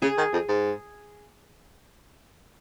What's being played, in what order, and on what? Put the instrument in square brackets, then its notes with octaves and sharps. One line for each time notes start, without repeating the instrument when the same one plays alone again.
[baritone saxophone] C#3 [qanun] G#4
[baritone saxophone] D#3
F2
G#2